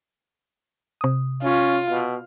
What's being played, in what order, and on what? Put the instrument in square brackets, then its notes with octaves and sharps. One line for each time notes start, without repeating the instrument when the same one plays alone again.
[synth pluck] C3 D#6
[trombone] C#4 [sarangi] F4
[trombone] B2